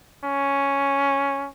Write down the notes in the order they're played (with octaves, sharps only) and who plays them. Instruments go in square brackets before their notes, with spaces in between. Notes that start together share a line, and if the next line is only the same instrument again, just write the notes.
[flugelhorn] C#4